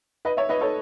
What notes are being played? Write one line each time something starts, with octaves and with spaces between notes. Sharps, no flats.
B4 D#5
C#5 E5
B4 D#5
A4 C#5